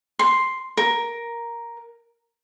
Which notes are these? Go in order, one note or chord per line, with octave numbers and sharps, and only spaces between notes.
C6
A#4